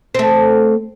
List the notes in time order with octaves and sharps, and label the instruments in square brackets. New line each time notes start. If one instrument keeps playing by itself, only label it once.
[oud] A3 C4